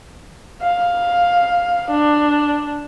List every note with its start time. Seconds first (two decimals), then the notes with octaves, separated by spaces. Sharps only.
0.62 F5
1.91 D4